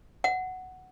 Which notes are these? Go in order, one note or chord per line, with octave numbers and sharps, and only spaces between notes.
F#5